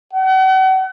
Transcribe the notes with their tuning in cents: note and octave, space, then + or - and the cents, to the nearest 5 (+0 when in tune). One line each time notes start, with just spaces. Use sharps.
F#5 +40